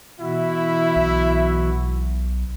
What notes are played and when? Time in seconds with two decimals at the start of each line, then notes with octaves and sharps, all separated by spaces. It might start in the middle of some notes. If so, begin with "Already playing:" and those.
0.20 B2 E3 E4 F#4
0.96 B1